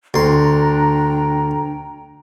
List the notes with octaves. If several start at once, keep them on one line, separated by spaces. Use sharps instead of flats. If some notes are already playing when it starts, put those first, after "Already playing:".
D2 D4 G5 A#5 C6